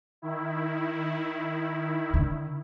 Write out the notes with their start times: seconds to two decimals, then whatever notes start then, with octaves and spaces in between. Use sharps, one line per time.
0.22 D#3 E4
2.14 D3